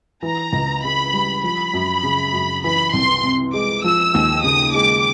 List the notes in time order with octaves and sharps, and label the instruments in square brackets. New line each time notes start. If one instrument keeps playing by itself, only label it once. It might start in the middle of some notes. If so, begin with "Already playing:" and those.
[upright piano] E3 [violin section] A#5
[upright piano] C#2
[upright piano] C#3 [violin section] B5
[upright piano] G3
[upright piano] F3 [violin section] B5
[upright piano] F#2
C#3
F#2
[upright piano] E3 [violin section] B5
[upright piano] C2 [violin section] C6
[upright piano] C3
[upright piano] G#3 [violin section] D6
[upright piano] F3 [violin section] E6
[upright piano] D#2
[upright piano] C#3 [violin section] D#6
[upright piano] G#3 [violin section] D6